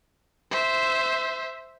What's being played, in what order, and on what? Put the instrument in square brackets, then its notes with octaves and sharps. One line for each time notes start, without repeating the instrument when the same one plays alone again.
[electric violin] C5 E5